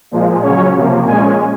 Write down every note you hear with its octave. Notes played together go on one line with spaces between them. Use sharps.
A#2 F3 G#3
C#3 F#3 C#4 C#5
C3 F3 A#3
A#2 G#3 C#4 G#5